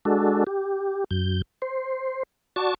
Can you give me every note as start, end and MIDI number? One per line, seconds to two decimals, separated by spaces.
0.05 0.44 56
0.05 0.44 62
0.05 0.44 66
0.05 0.44 69
0.47 1.04 67
1.11 1.42 42
1.11 1.42 91
1.62 2.23 72
2.56 2.74 66
2.56 2.74 74
2.56 2.74 81
2.56 2.74 85